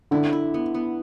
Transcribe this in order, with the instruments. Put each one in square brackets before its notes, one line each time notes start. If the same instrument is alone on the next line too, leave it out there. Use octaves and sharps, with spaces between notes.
[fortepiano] D3 [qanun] E4
[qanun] E4
B3
B3